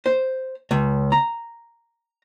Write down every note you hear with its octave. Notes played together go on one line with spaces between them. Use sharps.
C5
C#2
A#5